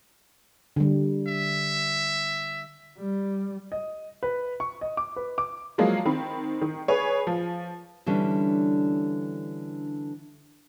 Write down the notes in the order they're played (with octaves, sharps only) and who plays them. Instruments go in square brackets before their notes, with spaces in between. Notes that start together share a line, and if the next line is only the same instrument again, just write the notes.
[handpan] D3 G3
[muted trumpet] E5
[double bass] G3
[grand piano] D#5
B4
C#6
D#5
D6
B4
D6
[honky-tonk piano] F3 F#3 G#3 A#3
D#3 C4 B5
D#3
G#4 B4 C#5
F3
[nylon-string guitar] D3 E3 G3 C#4 D4